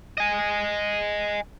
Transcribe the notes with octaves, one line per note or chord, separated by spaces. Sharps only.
D#5 G#5